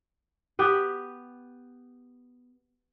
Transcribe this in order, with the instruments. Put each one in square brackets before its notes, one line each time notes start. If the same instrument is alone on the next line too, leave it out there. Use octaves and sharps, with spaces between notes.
[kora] B3 G4 B4